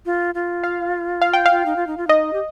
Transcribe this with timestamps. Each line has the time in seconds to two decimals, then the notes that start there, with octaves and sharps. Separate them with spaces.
0.06 F4
0.35 F4
0.64 F5
1.22 F5
1.33 G5
1.46 F5
1.51 F4
1.66 D#4
1.76 F4
1.87 D#4
1.97 F4
2.07 D#4 D#5
2.33 G4